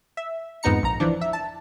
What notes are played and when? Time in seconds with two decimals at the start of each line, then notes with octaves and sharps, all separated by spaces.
0.17 E5
0.63 F2 G#2 B3 D#4 A#5 C#7
0.83 A#1 A#5
1.00 E3 F3 D4
1.21 E5
1.33 A5